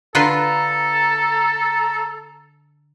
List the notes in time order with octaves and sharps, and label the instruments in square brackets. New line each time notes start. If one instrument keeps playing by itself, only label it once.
[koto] D3 F4 B4 [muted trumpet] A4 [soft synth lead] A#5